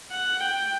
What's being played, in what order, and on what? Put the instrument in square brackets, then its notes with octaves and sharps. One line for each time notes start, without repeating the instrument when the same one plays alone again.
[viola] F#5
G5